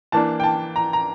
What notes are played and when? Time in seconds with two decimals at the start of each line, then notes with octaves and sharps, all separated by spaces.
0.12 E3 A#3 D4 A5
0.40 G5
0.43 A5
0.76 A#5
0.93 A#5